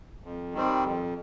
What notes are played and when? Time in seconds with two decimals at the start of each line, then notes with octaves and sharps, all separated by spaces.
0.24 F2
0.54 D#3 G3 C4
0.84 F2